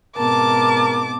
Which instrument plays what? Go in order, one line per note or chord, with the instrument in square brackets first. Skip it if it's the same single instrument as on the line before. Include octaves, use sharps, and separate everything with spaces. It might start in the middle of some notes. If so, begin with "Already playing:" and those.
[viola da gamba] G#2 B2 C4 [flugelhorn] A#4 [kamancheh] A5 [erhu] D6